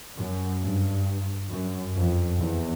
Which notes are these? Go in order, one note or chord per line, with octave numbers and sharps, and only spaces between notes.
F#2
G2
F#2
F2
E2